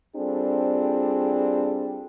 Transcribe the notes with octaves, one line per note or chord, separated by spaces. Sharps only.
G3 C4 D4 F4 G#4 A4